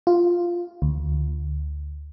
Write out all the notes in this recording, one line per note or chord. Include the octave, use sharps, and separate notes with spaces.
F4
D2